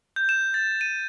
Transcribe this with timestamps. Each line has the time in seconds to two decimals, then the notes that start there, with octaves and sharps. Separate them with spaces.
0.16 G6
0.29 E7
0.54 A6
0.81 D#7